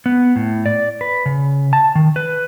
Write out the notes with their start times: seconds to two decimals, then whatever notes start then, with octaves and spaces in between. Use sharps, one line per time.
0.06 B3
0.36 A2
0.66 D5
1.01 B4
1.26 C#3
1.73 A5
1.95 D#3
2.16 B4